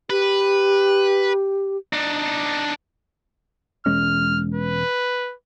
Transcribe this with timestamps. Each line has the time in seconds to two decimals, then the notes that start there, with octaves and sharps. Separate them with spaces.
0.10 G4 B4
1.93 D4 D#4
3.86 E1 G#3 C#4 F6
4.55 B4